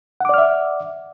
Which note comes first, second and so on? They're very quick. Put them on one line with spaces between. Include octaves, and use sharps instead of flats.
F#5 D6 D5 F6 E5